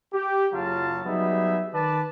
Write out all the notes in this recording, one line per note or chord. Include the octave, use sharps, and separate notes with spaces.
G4
F#1 C#3 F#3 F4 F5 A5
F#3 G3 B3 D#4 G#4 E5
D#3 B4 D5 A5